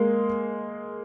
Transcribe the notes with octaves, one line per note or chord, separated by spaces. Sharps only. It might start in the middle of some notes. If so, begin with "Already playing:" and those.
Already playing: G#3 A#3